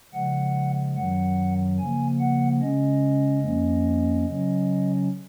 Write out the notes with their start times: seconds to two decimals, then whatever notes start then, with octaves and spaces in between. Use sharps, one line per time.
0.14 C#3 F3 G#3 F#5
0.96 F#2 D#3 F#3 F#5
1.78 C#3 F3 A#3 G#5
2.20 F#5
2.61 C#3 G#3 C#4 D#5
3.43 F2 F3 A#3 C#4
4.26 C#3 F#3 C#4